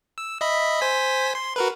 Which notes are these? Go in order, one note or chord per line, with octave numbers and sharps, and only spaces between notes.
E6
D#5 E5 B5
C5 G#5 B6
C6
F#4 A#4 B4